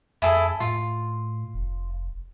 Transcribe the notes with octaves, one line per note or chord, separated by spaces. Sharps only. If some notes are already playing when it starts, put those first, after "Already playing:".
F2 E4 G#4 A4
A2 F4
F1